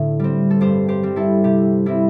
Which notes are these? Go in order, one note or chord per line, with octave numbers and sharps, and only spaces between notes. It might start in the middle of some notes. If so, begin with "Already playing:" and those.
Already playing: A2 D3 A3
G3 C4
A4
G2 G4 C5
G4 C5
G3 C4
E4 A4
C3 G4
G3 C4 E4